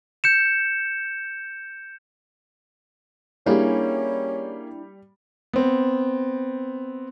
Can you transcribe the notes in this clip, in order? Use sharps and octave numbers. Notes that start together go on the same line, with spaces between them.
G6 C#7 E7
G3 A#3 C#4 D4 E4 G#4
B3 C4